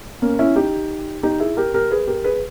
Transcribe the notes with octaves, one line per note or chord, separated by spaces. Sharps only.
A#3 C#4
C#4 E4
D#4 G4
D#4 G4
E4 G#4
G4 A#4
G4 A#4
G#4 B4
G4 A#4
G#4 B4